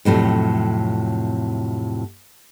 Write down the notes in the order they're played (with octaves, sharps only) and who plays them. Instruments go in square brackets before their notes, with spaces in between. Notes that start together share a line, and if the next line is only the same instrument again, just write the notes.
[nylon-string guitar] F2 A2 C3 F#3